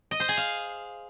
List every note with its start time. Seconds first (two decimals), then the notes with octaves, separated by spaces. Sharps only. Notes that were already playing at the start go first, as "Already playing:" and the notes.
0.11 D#5
0.20 C5
0.29 G#4
0.37 F5